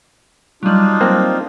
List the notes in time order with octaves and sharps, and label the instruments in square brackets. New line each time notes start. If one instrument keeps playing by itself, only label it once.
[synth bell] F#3 G3 [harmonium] D4 D#4 F4
[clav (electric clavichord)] A#3 C4